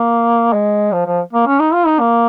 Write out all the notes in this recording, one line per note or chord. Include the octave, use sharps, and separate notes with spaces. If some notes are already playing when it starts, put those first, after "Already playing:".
Already playing: A#3
G#3
F3
F3
A#3
C#4
D#4
F4
D#4
A#3